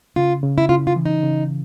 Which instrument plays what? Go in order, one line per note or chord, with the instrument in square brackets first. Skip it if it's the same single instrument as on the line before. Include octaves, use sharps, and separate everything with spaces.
[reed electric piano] C#3 [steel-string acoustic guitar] F4
[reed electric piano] C#3
[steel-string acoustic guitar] E4
[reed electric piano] C#3 [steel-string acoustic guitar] F4
[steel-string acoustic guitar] F4
[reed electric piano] E3
[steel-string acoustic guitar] D#4
[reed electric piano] C#3